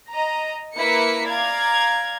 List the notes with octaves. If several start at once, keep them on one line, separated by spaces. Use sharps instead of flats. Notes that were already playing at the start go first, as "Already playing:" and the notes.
D#5 A#5
A#3 E4 A#4 B4 B6 C#7
D5 F5 A#5 G#6